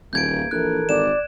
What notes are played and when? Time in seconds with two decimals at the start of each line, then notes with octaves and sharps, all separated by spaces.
0.13 D#1 E2 A#3 G6 G#6 D7
0.51 A#1 E3 A4 A#4 F#6
0.89 G#1 D5 E7